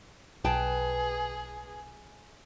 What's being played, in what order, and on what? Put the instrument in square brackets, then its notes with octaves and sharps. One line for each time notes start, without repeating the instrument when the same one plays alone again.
[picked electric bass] B1 [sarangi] G#4 [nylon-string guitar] B4 G5 A5